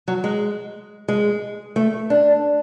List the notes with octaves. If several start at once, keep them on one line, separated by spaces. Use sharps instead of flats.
F#3
G#3
G#3
A3
D4